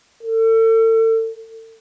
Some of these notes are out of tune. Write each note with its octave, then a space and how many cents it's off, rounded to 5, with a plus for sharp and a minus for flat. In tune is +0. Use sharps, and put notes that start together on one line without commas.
A4 +35